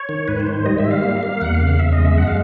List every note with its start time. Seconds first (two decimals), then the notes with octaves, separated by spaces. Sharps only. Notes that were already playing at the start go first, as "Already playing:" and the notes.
Already playing: C#5
0.09 D#3
0.28 G#2 B4
0.40 C5
0.47 D#3
0.53 C5
0.66 G3 D#5
0.78 E5
0.85 G3
0.91 F5
1.04 A#3
1.23 A#3
1.41 E2 F#5
1.54 F5
1.61 C#3
1.67 F5
1.79 E2 E5
1.92 D#5
1.99 G#3
2.05 E5
2.18 F#2 F#5
2.27 F5